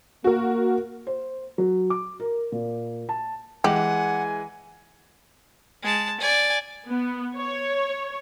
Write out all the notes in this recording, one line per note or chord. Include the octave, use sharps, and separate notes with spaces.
A#3 F#4 A#4
C5
F#3
D6
A#4
A#2
A5
E3 G#3 G4 F#5 G#5 F#7
G#3 A5
D5 G#5
B3
C#5